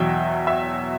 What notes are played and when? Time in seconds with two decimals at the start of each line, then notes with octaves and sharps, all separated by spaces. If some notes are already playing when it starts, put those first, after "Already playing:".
Already playing: E2 B2 F#3 E5 G5
0.47 E5